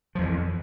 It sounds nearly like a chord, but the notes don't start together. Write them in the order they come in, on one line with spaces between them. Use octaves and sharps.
F3 F2 E3